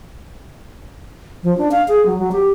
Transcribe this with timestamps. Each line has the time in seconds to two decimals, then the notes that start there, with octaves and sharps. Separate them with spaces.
1.43 F3
1.58 D4
1.71 F5
1.88 G#4
2.06 F#3
2.19 F#3
2.32 G4